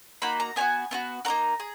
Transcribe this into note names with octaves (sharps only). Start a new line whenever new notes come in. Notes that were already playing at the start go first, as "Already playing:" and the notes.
A#3 D#4 F#4 B5
A#5
B3 D#4 F#4 G#5
B3 D#4 F#4
A#3 D#4 F#4 A#5
G#4